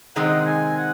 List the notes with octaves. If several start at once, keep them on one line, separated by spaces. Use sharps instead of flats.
C3 D#3 G#3 C4 D#4 F#5
G#5
F#5